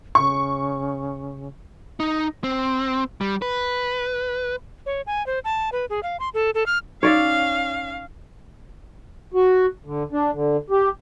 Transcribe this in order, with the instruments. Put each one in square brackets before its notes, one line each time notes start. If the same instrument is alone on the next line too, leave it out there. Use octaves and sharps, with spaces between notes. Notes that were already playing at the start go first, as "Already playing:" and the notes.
[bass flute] C#3 [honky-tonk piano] C#6
[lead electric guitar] D#4
C4
G3
B4
[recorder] C#5
G#5
C5
A5
B4
G#4
F5
C6
A4
A4
F6
[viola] C#4 F5 [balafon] D#4 [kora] C#5 D5 E5
[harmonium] F#4
D3
D4
D3
G4